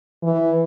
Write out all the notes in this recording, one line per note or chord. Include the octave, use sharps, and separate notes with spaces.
E3